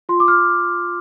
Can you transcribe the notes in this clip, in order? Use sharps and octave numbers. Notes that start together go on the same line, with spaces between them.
F4 C6
D6
F6